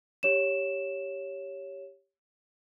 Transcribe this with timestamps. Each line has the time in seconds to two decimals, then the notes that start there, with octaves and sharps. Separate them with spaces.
0.23 G4 C#5 E7